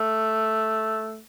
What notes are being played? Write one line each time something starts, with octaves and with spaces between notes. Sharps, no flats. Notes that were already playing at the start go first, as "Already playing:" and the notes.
Already playing: A3